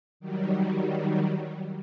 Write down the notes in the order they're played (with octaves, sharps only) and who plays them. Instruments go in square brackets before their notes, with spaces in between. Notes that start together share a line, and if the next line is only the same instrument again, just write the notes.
[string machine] D#3 F#3 G3